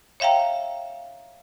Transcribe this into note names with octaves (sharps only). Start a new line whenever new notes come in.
C#5 E5 F5 G5 A#5